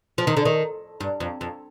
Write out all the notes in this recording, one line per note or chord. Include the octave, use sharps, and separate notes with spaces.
F3
D#3
D3
D#3
G2
F2
F2